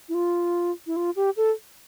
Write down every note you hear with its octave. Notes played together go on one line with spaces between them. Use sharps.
E4
F4
E4
F4
G4
A4